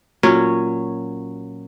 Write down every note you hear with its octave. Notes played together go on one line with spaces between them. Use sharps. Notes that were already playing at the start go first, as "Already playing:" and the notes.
A#2 F#3 C#4